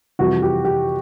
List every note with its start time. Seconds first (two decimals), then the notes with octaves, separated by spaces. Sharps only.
0.19 F2 C3 E3 G3 F#4
0.42 G4
0.65 G4